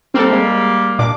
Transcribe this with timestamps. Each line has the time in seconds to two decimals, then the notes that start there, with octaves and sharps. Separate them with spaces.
0.14 G3 A#3 C4 A4
0.32 G#3
0.99 A#2 D4 D6